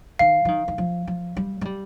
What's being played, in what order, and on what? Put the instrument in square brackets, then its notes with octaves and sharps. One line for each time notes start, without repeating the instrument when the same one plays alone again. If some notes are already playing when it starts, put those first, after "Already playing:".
[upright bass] D#3 [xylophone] F5
[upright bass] F3
D#3
D#3
F3
F3
G3
G#3
G3